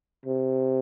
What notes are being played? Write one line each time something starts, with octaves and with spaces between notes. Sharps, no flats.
C3